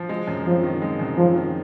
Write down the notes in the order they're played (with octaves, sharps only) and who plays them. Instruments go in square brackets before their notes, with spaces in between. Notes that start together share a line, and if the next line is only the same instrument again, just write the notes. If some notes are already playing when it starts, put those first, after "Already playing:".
Already playing: [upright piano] F3
G#3
F#2
[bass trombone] F3 [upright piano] C4
[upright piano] D#3
G#3
F#2
[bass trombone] F3 [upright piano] C4
[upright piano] D#3